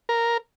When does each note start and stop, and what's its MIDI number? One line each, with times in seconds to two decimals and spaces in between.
0.09 0.37 70